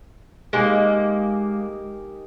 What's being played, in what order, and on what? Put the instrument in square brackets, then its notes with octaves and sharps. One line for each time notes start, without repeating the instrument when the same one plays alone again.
[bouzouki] G#3 A#3 [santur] D#4 G4 A#4